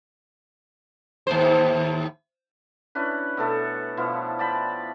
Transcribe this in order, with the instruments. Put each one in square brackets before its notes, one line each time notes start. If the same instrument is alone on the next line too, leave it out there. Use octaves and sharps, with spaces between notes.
[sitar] D#2 A2 C5
[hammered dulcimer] C#4 D4 E4 B4
B2 A3 A4 E5
B2 F3 E4 F4
D5 G5 A5 B5